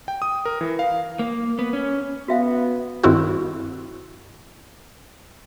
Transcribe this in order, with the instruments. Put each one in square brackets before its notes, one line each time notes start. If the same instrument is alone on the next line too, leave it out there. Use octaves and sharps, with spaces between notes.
[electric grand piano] G5
D#6
A#4
E3
F5
[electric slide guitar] A#3
B3
C#4
[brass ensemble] B3 [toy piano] F#4 E5 F5
[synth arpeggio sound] G2 D#3 C4 E4 F#4